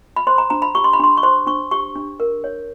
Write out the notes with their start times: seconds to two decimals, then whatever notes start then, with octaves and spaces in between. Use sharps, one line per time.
0.16 B5
0.27 C5 C6
0.38 A#5
0.50 D4 A#5
0.62 B5
0.75 G4 C#6
0.84 C6
0.93 B5
0.99 D4 C6
1.17 C#6
1.23 C5 C6
1.47 D4 C#6
1.71 G4 C#6
1.95 D4
2.20 A#4
2.44 C#5